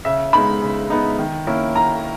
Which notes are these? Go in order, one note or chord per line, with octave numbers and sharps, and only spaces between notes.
C#3 E5
G#3 B3 D#4 B5
C#3
G#3 B3 D#4
D#3
A#3 C#4 E4
D#3 A#5